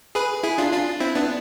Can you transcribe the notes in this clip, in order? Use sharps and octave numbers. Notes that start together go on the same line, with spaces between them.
G#4 B4
E4 G#4
D4 F4
D4 F4
C4 E4
B3 D4